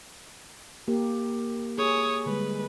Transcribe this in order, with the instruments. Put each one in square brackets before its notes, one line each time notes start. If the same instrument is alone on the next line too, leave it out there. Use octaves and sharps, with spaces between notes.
[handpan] A#3 G4 A#4
[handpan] G#4 [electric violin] C#5 D#6
[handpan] D3 G3 G#3 [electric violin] B4